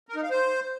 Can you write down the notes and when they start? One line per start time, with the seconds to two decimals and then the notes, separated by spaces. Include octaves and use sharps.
0.09 A#4
0.16 D#4
0.23 F5
0.30 C5